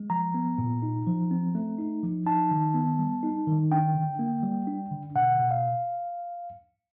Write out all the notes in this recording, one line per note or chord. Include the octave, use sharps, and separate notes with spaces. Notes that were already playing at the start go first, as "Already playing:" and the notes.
Already playing: G#3
F3 A#5
B3
A#2
D#4
F3
C4
A3
D#4
F3
D#4 A5
D#3
B3
G3
D#4
D#3
D4 G5
D3
A#3
G3
D4
D3
B2 F#5
B2
F5